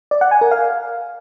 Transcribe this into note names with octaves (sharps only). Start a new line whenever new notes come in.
D5
F#5
G#5
A#4
F5